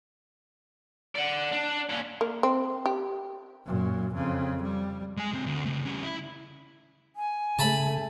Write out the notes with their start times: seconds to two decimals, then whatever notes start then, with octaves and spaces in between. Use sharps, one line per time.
1.16 D5 F#5
1.53 D4
1.89 A#2 C#4
2.21 A#3
2.43 C4
2.86 G4
3.65 F#2 A#2
4.14 F2 C#3
4.63 G3
5.17 G#3 G#5
5.33 D3 C4
5.46 D2
5.65 C#3 A3
5.85 G3 C#4
6.03 E4
7.16 G#5
7.59 C#3 A3 A5 B5